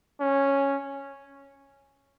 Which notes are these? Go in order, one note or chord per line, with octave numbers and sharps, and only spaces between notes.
C#4